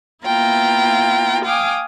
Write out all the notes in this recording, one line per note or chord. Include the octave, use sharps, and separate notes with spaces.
A#3 B3 E4 F4 G5 A#5
F5 G5 G#5 D6 D#6